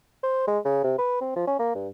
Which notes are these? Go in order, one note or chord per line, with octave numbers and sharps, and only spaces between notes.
C5
G#3
C#3
C3
B4
C4
F3
C#4
A#3
G2